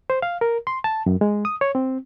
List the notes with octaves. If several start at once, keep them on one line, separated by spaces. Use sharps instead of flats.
C5
F5
A#4
C6
A5
F#2
G#3
D#6
C#5
C4